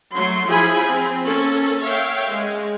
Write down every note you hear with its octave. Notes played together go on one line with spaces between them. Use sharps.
F#3 A3 C6
F3 E4 G#4 G#5 B5
C4
A#3 C#4 A4
C#5 E5 F5 G5
G#3